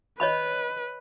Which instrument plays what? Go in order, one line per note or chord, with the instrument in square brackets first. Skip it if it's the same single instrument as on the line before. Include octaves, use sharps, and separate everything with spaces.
[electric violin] B4 [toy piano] C#5 D#5 B5